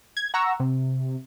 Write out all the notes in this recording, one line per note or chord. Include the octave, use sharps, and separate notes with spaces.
G#6
F#5 A#5 C#6 E6
C3